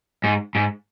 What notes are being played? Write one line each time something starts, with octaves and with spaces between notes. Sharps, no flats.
G#2
G#2